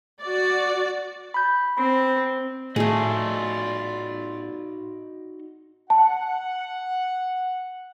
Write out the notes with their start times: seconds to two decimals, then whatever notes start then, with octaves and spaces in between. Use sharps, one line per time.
0.22 F#4 D5
1.34 B5 G6
1.77 C4 B5
2.76 A2 A3 D#4 F4 F#4 G#4 D5 D#5
5.90 F#5 A5